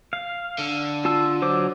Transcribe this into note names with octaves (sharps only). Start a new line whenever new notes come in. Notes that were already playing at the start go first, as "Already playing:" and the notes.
F5
D3
F4 A5 E6
F#3 C5 D6